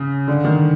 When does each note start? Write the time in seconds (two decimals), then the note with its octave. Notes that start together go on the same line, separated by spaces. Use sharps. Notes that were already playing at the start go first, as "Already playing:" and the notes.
Already playing: C#3
0.28 D3
0.45 D#3